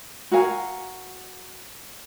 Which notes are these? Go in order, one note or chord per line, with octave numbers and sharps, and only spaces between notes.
F#4 A#4 F5 G#5